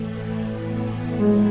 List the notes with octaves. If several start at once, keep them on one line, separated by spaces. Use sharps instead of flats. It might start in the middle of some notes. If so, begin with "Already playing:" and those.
Already playing: A2 E3 A3
A2 E3 B3
A2 F#3 G#3 A3 E4